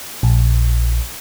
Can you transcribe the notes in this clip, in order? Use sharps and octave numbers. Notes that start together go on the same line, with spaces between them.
A#1